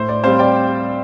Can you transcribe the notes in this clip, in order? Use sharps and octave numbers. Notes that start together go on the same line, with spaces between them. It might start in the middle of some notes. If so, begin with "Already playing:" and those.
Already playing: A2 C5
D5
G3 C4 C5 F5
D5 G5